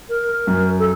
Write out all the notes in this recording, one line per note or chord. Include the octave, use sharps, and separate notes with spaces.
A#4
F#2
A4